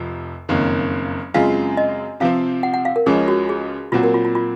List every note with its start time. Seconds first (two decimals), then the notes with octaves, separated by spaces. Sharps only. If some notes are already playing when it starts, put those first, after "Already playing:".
Already playing: F1 F2 C3 F3
0.49 F#1 F2 D#3 A#3 C#4
1.34 F#2 C#3 G#3 C4 F4 F5
1.77 D#5
2.20 C3 F3 C4 F5
2.63 F#5
2.74 F#5
2.85 F5
2.96 A#4
3.06 C#2 C#3 F3 G#3 C#4 G#4
3.28 F#4
3.49 G#4
3.92 A#2 F#3 C4 F4 F#4
4.03 A#4
4.14 F4
4.25 F4
4.35 F4